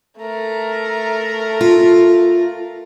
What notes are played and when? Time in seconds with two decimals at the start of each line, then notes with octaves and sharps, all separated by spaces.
0.18 A3 A#4
1.61 F4